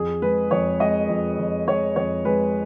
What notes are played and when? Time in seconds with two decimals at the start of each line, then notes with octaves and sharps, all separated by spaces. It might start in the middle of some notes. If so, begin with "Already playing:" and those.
Already playing: F2 G#4
0.22 G#3 B4
0.51 F2 C#5
0.80 G#3 D#5
1.09 F2
1.38 F2
1.67 G#3 C#5
1.96 F2 C#5
2.25 G#3 B4